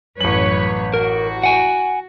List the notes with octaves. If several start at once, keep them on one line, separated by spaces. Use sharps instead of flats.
A1 F#2 B4 C#5 F#7
F#4 A#4
F#5 G#5